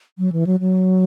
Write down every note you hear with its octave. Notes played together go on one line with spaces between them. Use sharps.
F#3
E3
F#3
F#3